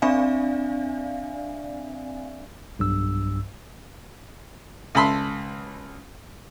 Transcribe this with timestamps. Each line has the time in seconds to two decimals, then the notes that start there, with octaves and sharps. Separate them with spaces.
0.02 C4 D4 D5 E5 F5 G#5
2.79 B1 G2 E6
4.95 C#2 A4 B5 C6